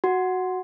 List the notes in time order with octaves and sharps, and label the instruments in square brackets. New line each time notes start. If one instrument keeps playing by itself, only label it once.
[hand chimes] F#4